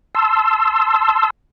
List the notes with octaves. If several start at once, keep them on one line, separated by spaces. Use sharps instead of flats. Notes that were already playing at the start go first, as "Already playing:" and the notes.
A5 C6 E6